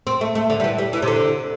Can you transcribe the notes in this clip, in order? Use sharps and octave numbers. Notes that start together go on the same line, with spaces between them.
C4
A3
A3
D3
G3
E3
G3
E3
C3
D3